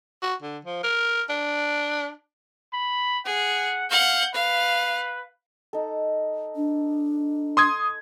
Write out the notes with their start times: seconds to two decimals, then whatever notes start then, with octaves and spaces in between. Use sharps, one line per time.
0.22 F#4
0.42 D3
0.65 F3
0.83 A#4
1.29 D4
2.73 B5
3.26 G#4 F#5
3.91 F5 F#5 G6
4.34 B4 F5
5.73 D#4 A4
6.56 D4
7.57 C6 D#6 G#6